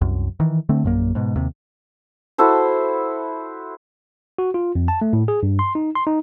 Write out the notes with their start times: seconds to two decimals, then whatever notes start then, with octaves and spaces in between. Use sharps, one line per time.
0.01 C2 F#2
0.40 D#3 E3
0.69 D3 A3 C4
0.84 A#1 F#2 A#3
1.15 G#2 B2
1.36 D#2 C3
2.38 E4 F#4 A4 C5
4.39 F#4
4.54 F4
4.75 F2
4.88 A5
5.02 A3
5.13 A2
5.28 G#4
5.43 G2
5.59 C6
5.75 D#4
5.95 C6
6.07 D#4